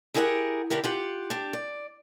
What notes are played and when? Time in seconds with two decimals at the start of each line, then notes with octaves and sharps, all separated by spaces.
0.14 E4 G4 G#4 A#4 C#5 F#5
0.70 D3 D4 E4 G4 A#4
0.84 F4 G4 F#5
1.30 D4 G4
1.53 D5